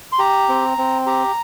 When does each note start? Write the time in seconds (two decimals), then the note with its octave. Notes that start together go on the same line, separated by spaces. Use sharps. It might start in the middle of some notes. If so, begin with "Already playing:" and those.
0.12 C6
0.19 G4 A#5
0.49 C4
0.78 C4
1.06 G4 A#5